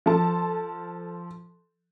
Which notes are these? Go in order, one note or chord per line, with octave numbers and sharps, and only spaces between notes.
F3 A4 A5